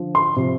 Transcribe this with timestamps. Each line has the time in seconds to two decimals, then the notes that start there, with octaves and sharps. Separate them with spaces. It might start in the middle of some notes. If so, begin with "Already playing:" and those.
Already playing: D3 F3
0.15 C6
0.36 C3 F3